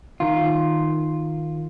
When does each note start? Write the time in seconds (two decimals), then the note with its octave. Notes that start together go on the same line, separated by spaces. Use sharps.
0.20 D#3 F4